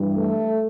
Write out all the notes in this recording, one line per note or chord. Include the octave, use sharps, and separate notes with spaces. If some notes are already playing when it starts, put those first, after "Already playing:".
Already playing: G2 E3 G3
A3